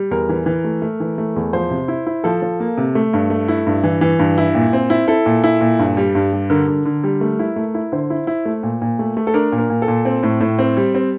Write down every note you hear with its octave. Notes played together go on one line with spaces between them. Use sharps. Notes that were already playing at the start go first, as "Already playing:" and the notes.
Already playing: G3
E2 A#4
E3
E3
A3
A3
E3
A3
E2
F3 C5
C3
E4
E4
F3 A4
F3
A#3
C3
A3
G2
A3
E4
G2
E3
E3
G2
E4
A#2
C4
E4
E4 A4
A#2
E4
A#2
G2
G3
G2
G3
D3 A#4
D3
D3
G3
A3
E4
A3
E4
D3 C5
E4
E4
A3
A#2
A#2
A3
A3
A4
D4 A#4
A#2
A#4
A#2
A4
A#2
C4
A2
A2
C4
G3
C4